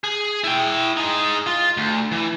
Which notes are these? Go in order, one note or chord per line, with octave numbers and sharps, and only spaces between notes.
G#4
E4 G5
D#4 G#4
F4
D2
E3